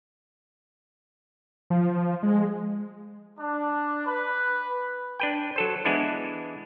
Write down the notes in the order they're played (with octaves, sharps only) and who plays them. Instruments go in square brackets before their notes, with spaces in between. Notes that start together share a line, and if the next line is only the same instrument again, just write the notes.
[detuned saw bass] F3
G#3
[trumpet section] D4
B4
[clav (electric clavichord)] D4 B4 G5
F#3 A4 C5
E3 G#3 B3 D4 E4